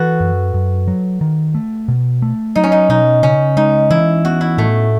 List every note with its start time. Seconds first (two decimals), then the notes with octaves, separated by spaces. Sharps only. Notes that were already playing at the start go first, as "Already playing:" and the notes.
Already playing: E3 F#4 A4 B4
0.20 F#2
0.54 F#2
0.87 F#3
1.21 D#3
1.55 A3
1.88 B2
2.22 A3
2.55 F#3 D#4
2.64 C#4
2.72 D#4
2.89 B2 D#4
3.23 C#3 C#4
3.57 G#3 D#4
3.90 E3 E4
4.24 B3 F#4
4.41 E4
4.58 A2 A3